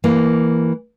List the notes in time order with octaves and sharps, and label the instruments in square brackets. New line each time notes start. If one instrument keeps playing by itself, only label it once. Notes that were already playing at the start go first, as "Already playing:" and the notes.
[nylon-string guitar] E3 A#3